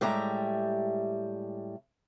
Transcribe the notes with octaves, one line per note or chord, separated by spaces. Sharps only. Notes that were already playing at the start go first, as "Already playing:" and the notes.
A2 G3 G#3 G4 E5 A#5